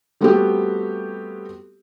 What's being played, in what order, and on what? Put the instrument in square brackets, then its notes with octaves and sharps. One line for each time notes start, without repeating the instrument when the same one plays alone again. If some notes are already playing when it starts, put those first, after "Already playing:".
[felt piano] G3 A3 B3 C4 F#4 G4